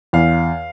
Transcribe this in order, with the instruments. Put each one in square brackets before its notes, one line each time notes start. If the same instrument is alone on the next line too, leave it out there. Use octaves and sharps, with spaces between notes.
[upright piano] E2 [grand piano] F5